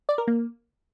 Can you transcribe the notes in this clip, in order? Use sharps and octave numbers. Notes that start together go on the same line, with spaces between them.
D5
A#4
A#3